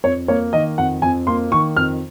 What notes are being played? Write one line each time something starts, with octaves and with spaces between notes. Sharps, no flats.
F2 C#5
A#3 C#5
D#3 D#5
F2 F#5
F2 G#5
A#3 C6
D#3 C#6
F2 F6